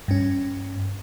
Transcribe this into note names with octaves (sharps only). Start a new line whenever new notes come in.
G2 C#4